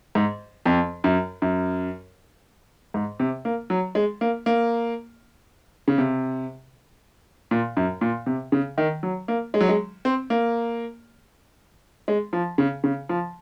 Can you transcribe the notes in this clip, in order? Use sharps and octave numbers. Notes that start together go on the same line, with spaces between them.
G#2
F2
F#2
F#2
G#2
C3
A#3
F#3
G#3
A#3
A#3
C#3
C3
A#2
F#2
A#2
C3
C#3
D#3
F#3
A#3
G#3
F#3
G#3
C4
A#3
G#3
F3
C#3
C#3
F3